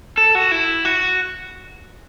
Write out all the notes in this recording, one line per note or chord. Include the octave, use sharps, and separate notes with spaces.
A4
F#4
E4
F#4